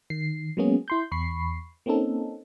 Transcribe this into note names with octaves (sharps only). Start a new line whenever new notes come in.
D#3 C7
F#3 G#3 A#3 B3 C#4 G#4
E4 C6 G6
E2 B5 C#6 C7
A#3 C4 C#4 D#4 A4